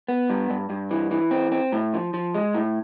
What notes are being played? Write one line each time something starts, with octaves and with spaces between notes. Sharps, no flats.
B3
G2
G2
G2
E3
E3
C4
C4
A2
F3
F3
G#3
A2